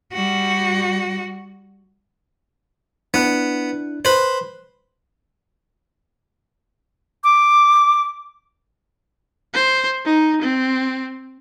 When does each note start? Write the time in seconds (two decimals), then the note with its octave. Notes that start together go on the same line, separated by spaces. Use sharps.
0.13 G3 F#4
3.14 B3 D4 E4 F#6
4.05 B4 C5
7.24 D6
9.54 C5
10.05 D#4
10.42 C4